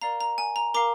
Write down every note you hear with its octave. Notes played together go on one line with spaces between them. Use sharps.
A#4 D5 F5 A#5
A#5
G#5
A#5
A#4 F5 A#5 D6